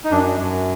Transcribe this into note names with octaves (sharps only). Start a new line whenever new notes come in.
D#4
F#2 D4
F#2